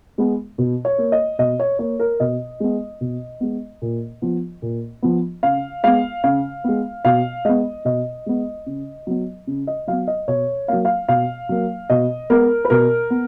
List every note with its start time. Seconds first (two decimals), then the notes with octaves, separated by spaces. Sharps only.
0.18 G#3 B3
0.58 B2
0.85 C#5
0.98 A#3
1.12 D#5
1.39 B2 D#5
1.60 C#5
1.79 A#3 C#5
1.99 A#4
2.20 B2 D#5
2.60 G#3 B3
3.01 B2
3.40 G#3 B3
3.82 A#2
4.22 F3 B3
4.62 A#2
5.02 F3 B3
5.43 C#3 F5
5.83 G#3 B3 F5
6.24 C#3 F5
6.64 G#3 B3
7.05 B2 F5
7.45 G#3 B3 D#5
7.85 B2 D#5
8.26 G#3 B3
8.66 C#3
9.07 F#3 B3
9.47 C#3
9.67 D#5
9.87 F#3 B3 F5
10.08 D#5
10.28 B2 C#5
10.68 F#3 A#3 F5
10.85 F5
11.08 B2 F5
11.49 F#3 A#3
11.90 B2 D#5
12.30 G#3 B3 A#4
12.65 B4
12.70 B2 A#4
13.10 B3